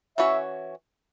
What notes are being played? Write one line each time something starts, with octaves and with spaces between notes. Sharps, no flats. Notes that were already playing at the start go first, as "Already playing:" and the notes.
E3 C#4 F#4 C#5 E5